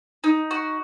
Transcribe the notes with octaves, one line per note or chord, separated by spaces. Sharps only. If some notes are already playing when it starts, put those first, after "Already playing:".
D#4
F#4